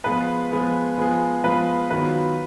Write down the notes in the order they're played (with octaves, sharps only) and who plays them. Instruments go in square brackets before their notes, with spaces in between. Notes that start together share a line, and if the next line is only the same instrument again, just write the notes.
[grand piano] F3 G#3 B3 F4 G#4 [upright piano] B4
[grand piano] F3 G#3 B3 F4 G#4
F3 G#3 B3 F4 G#4
[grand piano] F3 G#3 B3 F4 G#4 [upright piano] B4
[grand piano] D#3 F#3 B3 F4 [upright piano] B4